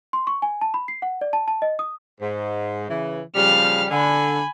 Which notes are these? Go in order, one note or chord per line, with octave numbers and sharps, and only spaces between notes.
C6
C#6
G#5
A5
B5
C7
F#5
D5
A5
A5
D#5
D#6
G#2
C#3 E3
C#3 F3 G3 F5 F6
D3 G#5 B5